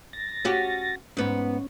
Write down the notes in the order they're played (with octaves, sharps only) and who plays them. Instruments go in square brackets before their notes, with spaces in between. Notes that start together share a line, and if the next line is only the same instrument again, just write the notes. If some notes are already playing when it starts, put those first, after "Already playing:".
[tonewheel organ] A6 A#6
[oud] C#4 F#4 G4
[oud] G#2 B3 [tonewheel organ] C#4